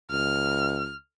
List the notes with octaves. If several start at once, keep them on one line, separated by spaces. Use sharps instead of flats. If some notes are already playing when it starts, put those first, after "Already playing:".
C#2 F6